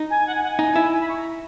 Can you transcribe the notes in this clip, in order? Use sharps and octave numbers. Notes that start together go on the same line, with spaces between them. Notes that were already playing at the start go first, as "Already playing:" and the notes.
Already playing: D#4
G#5
F#5
G#5
F#5
G#5
D#4
E4
G#5
B5
C#6
A#5